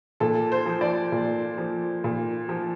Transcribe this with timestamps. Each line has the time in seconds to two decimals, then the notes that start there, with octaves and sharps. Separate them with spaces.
0.20 A#2 A4
0.52 C5
0.66 F3
0.81 D5
1.12 A#2
1.58 F3
2.04 A#2
2.49 F3